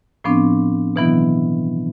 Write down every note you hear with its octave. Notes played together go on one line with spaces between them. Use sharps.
A2 F3 B3 C4 D4
B2 D#3 E3 F#3 B3 E4